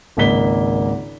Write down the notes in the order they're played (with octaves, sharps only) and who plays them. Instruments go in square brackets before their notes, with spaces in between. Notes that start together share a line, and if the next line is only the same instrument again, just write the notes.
[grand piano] G#1 C#2 A#3 D#5 B6 G7